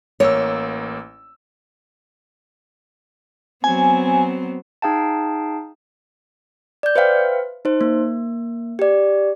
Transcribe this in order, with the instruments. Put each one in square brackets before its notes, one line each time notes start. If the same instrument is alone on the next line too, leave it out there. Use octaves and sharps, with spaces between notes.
[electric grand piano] A1 A#3 E6 [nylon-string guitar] C#5
[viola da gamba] F#3 B3 C4 [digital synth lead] G#5
[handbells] D#4 G#4 F5 G5 A5
[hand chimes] D5 G6
B4 C5 E5 F5 G5
D#4 C5
A#3
G4 D5